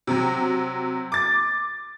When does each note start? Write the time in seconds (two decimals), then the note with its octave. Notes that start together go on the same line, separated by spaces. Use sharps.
0.07 C3 F#3
1.12 D6 A6